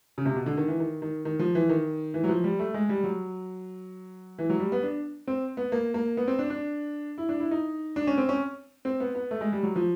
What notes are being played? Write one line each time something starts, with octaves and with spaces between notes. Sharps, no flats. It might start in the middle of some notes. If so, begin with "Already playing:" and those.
C#3
C3
B2
D3
D#3
E3
D#3
D#3
D#3
F3
E3
D#3
E3
F#3
F3
G3
A3
G#3
G3
F#3
E3
F#3
G3
B3
D4
C4
B3
A#3
A#3
B3
C4
D4
D4
E4
D4
E4
D#4
D4
C#4
C4
C#4
C4
B3
B3
A3
G#3
G3
F#3
F3